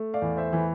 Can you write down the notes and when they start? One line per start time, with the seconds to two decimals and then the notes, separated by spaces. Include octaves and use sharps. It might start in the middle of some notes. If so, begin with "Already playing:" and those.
Already playing: A3
0.14 D5 F5
0.22 E2
0.37 C5 E5
0.53 E3